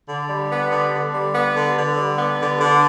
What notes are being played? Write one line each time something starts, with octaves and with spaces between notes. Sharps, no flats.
D3
G3
B3
D3
D3
G3
B3
D3
D3
G3
B3
D3
D3